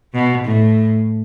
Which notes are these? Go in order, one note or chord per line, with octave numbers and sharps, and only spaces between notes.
B2
A2